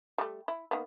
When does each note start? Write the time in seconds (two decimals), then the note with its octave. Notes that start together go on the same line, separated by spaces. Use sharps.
0.18 G3 A3
0.48 E4
0.71 D#3 A#3 B3